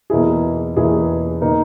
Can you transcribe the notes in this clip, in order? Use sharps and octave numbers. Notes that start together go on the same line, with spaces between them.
E2 B2 A#3 E4 G#4
E2 B2 A#3 E4 G#4
B2 A#3 D#4 A#4